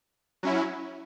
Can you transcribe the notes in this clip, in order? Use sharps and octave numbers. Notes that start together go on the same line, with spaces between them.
F#3 C#4 E4